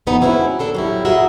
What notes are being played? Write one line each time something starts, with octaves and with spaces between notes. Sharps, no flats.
F2 E3 B3 D#4
G#3 C4 C#4 E4 F#4
D4 A4 A#4
F#3 G3 E4
F#4 G#4 A#4 D#5 E5